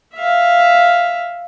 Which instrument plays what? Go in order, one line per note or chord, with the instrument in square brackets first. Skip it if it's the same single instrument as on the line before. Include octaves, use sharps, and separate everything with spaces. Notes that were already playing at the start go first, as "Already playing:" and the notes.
[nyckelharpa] E5 F5